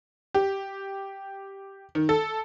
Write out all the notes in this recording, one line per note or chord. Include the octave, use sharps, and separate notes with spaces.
G4
D#3
A4